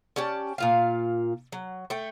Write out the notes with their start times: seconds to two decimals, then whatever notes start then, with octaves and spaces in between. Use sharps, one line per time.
0.16 C#4 G4 D5 A5
0.58 A#2 F4 F5
1.52 F#3
1.90 A3 G5